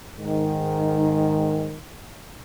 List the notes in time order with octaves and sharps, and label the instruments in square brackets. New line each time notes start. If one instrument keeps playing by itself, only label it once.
[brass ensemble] G#2 D#3